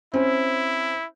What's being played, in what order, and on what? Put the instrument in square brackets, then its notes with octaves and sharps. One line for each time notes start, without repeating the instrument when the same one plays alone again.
[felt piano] C4 C#4 [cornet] E4